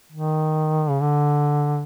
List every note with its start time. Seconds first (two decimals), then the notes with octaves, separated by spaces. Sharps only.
0.12 D#3
0.90 C#3
1.01 D3